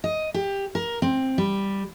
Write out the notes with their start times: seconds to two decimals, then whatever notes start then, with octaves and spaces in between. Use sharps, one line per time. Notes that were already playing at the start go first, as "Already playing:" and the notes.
0.04 D#5
0.34 G4
0.75 A#4
1.02 C4
1.38 G3